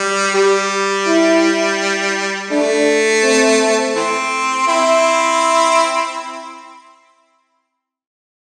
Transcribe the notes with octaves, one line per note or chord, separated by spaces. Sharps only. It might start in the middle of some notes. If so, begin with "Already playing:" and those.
Already playing: G3
G3 G4
E4
A3 D4
C4
E3 A3 C4
C4 E4